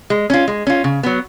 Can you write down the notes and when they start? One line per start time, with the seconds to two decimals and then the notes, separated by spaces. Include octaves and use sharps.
0.10 G#3
0.30 C#4 F4
0.48 G#3
0.67 C#4 F4
0.84 C#3
1.03 F#3 B3